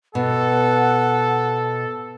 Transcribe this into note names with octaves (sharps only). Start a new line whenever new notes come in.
B2 A4 F#5